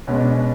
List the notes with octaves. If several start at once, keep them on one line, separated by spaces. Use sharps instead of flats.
B2 G#3 B3 C#4
D4
C#4